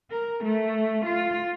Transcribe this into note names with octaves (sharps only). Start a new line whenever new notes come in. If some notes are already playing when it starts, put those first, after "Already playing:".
A#4
A3
F4